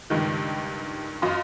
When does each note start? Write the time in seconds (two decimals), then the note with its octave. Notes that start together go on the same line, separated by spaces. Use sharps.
0.10 C#2 G2 D#3
1.22 F#2 F4 D#5 C6